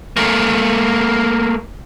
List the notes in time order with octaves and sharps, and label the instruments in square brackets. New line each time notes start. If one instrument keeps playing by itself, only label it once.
[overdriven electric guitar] A3 A#3